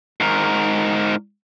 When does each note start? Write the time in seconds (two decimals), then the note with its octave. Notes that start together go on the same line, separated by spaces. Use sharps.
0.20 G#2 A#4